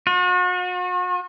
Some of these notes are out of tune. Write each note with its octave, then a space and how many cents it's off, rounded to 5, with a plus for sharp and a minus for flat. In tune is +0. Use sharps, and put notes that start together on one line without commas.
F#4 -40